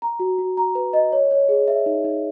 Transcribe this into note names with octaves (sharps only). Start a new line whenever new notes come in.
A#5
F#4
F#4
A#5
B4
D#5
C#5
C#5
G#4
E5
D#4
D#4